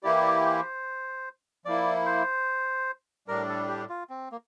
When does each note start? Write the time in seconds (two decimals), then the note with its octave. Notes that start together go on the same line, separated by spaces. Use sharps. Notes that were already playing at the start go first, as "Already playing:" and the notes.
0.03 E3 A#3 E4 G4 D5
0.21 D5
0.44 C5
1.65 F3 A#3 E4 D5
2.06 C5
3.28 A2 G3 D4 A#4
3.49 A4
3.68 G4
3.89 F4
4.10 C4
4.32 A#3